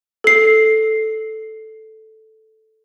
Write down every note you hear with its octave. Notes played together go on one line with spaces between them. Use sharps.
A4 C7